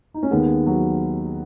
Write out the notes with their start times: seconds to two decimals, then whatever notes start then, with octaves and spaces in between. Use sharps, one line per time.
0.14 D#4
0.23 C#4
0.31 D#2 D#3 G#3 B3
0.66 F#3